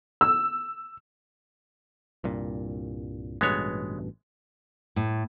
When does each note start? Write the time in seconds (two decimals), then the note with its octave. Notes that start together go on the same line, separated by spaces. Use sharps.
0.21 E6
2.24 C2 G2 A#2
3.41 A1 G2 B2 G#3 B3 C#5
4.96 A2